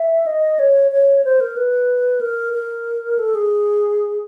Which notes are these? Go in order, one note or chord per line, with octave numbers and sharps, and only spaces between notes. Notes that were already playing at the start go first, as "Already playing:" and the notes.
Already playing: E5
D#5
C#5
C#5
C5
A#4
B4
A#4
A#4
A4
G#4